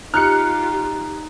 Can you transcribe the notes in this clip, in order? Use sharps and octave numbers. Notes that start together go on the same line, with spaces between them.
D#4 F4 G4 F6 F#6 C#7